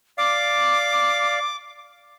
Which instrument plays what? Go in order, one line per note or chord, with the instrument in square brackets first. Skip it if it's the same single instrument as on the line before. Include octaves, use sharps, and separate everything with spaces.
[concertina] D5 F5 [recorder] D6